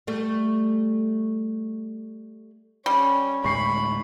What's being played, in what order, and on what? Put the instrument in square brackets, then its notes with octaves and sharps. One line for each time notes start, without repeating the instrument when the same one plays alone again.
[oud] G3 A3
[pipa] G3 [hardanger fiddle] C#4
[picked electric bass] D2 A2 G#3 [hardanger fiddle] B5 [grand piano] C#6 C7